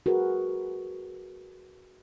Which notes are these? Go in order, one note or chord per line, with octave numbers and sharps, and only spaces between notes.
F#4 G#4 A#4 B4